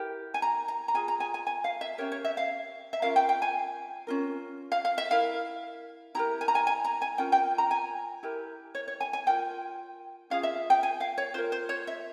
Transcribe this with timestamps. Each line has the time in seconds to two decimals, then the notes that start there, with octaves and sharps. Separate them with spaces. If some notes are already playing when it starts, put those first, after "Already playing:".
Already playing: E4 G4 A#4
0.34 G#5
0.42 A#5
0.68 A#5
0.88 A#5
0.94 F4 G#4 G#5
1.08 A#5
1.20 G#5
1.34 G#5
1.47 G#5
1.64 F5
1.81 E5
1.98 C#4 G4 A#4 C#5
2.12 C#5
2.24 E5
2.37 F5
2.93 E5
3.02 C#4 F4 A#4 F5
3.16 G5
3.29 G5
3.42 G#5
4.07 C#4 F4 A#4
4.72 F5
4.85 F5
4.98 E5
5.11 E4 A#4 F5
6.15 E4 G4 A#4 A#5
6.41 G#5
6.48 A#5
6.55 G#5
6.67 G#5
6.84 A#5
7.02 G#5
7.18 C#4 F4 A#4 G5
7.32 G5
7.58 A#5
7.71 G#5
8.23 E4 G4 A#4
8.75 C#5
8.88 C#5
9.00 G#5
9.13 G#5
9.27 F4 A#4 G5
10.30 C#4 F4 G#4 F5
10.43 E5
10.70 G5
10.83 G#5
11.00 F5
11.18 C#5
11.34 F4 A#4 C5
11.52 C5
11.69 C#5
11.87 E5